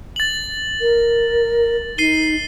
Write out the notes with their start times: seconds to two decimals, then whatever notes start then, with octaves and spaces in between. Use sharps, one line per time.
0.16 A6 F#7
0.81 A#4
1.98 D#4 C7 D#7 G7